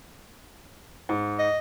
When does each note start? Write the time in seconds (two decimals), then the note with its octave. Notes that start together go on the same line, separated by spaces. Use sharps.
1.09 G#2
1.39 D#5